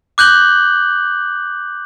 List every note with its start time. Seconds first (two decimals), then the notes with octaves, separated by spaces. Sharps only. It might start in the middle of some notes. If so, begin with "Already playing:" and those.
0.18 D6 F#6 G6 F#7 G7